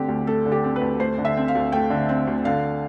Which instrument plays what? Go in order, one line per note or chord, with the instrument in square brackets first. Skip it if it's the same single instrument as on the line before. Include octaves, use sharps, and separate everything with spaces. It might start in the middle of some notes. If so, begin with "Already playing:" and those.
Already playing: [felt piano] D3 A3 C4 G4
D2
A3 A4
D3
G4
C4
B4
D2
A3 C5
D3
E5
C4
F5
D2
A3 G5
D3
C4
D2
D3 F5